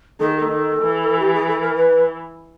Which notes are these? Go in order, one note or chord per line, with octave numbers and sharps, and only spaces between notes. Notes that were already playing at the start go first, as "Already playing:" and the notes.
D#3 A4
G#4
A4
D#3
E3
G4
G#4
A4
A#4
B4